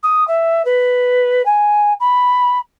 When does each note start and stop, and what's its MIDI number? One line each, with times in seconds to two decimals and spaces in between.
0.03 0.26 87
0.27 0.65 76
0.65 1.45 71
1.45 1.93 80
2.00 2.58 83